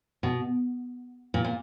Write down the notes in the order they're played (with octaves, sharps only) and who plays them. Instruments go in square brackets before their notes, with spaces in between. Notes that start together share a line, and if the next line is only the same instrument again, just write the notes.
[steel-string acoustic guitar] B2
A#2
A#2